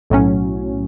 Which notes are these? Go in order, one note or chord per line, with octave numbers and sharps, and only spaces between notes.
B1 A2 F#3 C#4